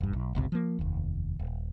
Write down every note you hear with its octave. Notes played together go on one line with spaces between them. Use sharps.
E1 G2
B1
G1 C#2 C3
F3 A#3
F1 D#2
D#1